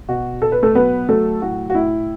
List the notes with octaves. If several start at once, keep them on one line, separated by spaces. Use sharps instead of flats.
B2 F#4
B2 A4
B4
A3 A4
F#3 B3 B4
F#3 A3 A4
A2 F#4
F#4
A2 E4